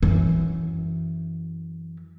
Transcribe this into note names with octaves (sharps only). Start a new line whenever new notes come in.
F#2 E3